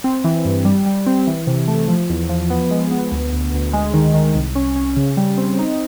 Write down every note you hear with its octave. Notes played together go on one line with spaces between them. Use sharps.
C4
E3
G2
G3
G3
C4
E3
C3
A3
F3
E2
F3
B3
G#3
B3
D2
D2
D2
G#3
D#3
D#3
C2
C#4
C#4
C#3
G3
C4
D#4